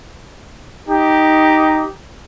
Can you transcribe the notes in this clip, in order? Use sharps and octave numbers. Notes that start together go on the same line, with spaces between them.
D#4 G4